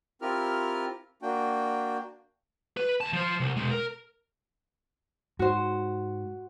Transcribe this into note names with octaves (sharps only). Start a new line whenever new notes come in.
C4 E4 F4 G4 A#4 F6
A#3 D4 F#4 G5
B4
D2 A5
F3 C5
C2
B2 G#3
A#4
G#2 F#4 C5